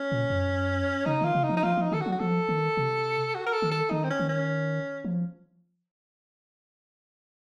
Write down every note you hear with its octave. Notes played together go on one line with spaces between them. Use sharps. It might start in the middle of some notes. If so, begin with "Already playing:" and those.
Already playing: C#4
A#2
F#2
C#3 D#4
D#3 F4
C#3
D#4
F3
D#4
F3 F4
F3 D#4
D#3 A4
F#4
F#3
F#4
F3 A4
D#3
C3
F#4
A#4
A4
D#3
A4
D#3 D#4
C4
C#4
D#3
C#4
F3